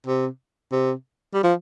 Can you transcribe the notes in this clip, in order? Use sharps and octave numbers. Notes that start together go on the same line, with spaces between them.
C3
C3
G3
F3